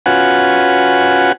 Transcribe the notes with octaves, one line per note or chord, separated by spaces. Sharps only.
C#4 F4 F#4 B4 F#5 G#5